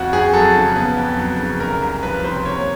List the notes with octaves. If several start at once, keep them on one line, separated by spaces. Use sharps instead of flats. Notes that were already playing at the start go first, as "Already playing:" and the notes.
Already playing: F2 F#4
F2 G#4
F#3 A4
C#3
B3
F2
F#3
C#3
C2 A#4
C2
F3 B4
C3 C5
A#3 C#5